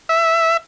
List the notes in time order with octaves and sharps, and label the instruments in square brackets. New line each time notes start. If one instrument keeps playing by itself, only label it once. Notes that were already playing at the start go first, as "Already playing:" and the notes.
[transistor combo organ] E5